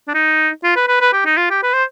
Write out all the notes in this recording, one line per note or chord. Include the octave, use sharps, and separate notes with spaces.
D4
D#4
F4
B4
B4
B4
G4
D#4
F4
G4
B4
C5